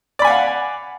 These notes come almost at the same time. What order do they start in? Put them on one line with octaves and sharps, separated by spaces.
D5 B5 G#5 F#5 F5